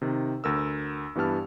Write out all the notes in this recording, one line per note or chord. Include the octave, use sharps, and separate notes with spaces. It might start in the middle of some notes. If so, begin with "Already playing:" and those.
C3 D#3
D2 A#4 E6
G2 E3 B3 G4 A5 F6